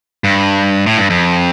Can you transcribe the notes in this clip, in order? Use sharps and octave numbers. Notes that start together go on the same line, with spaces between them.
G2
A2
G2
F2